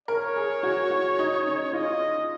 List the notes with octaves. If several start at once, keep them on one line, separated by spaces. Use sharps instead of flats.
A#4 C#5
G#4
F#4
F#4
D#4
C#4
F4 D#5